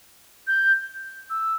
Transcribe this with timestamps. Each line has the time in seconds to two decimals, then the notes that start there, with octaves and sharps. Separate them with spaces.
0.47 G6
1.30 E6